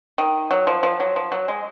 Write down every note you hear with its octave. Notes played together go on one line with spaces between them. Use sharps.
D#3
F#3
F3
F3
F#3
F3
F#3
G#3